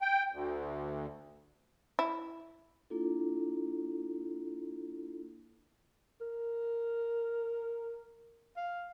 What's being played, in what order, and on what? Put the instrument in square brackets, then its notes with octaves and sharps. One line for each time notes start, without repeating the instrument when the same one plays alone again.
[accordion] G5
D2
[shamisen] E4
[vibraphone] A#3 D4 E4 F4 A4
[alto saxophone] A#4
F5